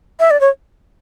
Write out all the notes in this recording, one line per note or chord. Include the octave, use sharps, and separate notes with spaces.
E5
D5
C#5